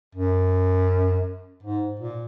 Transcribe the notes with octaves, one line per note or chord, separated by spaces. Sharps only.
F#2
G#2
A#2